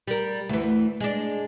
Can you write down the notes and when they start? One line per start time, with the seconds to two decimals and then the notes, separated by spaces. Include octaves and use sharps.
0.08 G3 A#4
0.49 D2 E3
1.00 G#3 D4